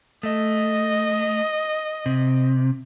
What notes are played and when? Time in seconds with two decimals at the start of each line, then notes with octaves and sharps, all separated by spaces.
0.23 A3 D#5
2.06 C3